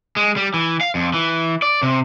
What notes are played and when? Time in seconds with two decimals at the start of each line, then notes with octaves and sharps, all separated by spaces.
0.17 G#3
0.36 G3
0.54 E3
0.81 F5
0.95 F2
1.14 E3
1.62 D5
1.83 C3